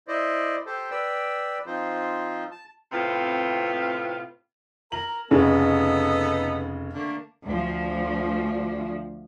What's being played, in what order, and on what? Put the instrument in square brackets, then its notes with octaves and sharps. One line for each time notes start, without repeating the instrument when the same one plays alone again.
[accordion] E4 C5 D5 D#5
G4 A4 C5
B4 D5 G5 E6
F3 C4 D#4 F4 C5
A5
[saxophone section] A2 C3 B3 C4 F4
[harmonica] A#4 A#5 [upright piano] F#7
[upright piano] F1 C#3 [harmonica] B3 D#4 A4
[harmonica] D3 A3 A#3
[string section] D2 F3